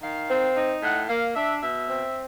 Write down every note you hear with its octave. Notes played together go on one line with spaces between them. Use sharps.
D#3 F5
C4
D#4
A2 F#5
A#3 F5
D4 E5
B2 E5
C4